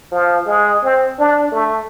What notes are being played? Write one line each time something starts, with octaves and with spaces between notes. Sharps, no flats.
F3
G#3
C4
D4
A3